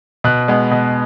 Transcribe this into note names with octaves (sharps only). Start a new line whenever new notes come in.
B2 F#6
G#3 B3
B2